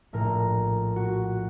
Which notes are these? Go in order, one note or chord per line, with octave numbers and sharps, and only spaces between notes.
A#1 A2 A#4
F#4